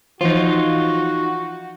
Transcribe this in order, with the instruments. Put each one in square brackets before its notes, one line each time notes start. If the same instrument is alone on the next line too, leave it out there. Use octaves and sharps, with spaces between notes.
[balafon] E3 F3 [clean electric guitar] D#4 F4 [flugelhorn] F#4